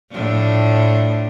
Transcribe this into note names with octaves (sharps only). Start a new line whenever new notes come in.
A2 F3 D4